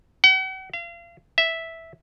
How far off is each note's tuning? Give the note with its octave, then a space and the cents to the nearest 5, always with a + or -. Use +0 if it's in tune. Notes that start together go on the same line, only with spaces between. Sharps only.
F#5 +45
F5 -35
E5 -5